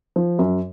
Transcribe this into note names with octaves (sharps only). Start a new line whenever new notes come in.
F3
F#2